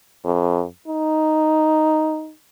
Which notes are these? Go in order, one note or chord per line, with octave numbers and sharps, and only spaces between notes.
F2
D#4